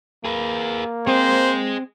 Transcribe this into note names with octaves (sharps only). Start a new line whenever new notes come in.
A#3 G#4 B4
C4 G#4 C5 D#5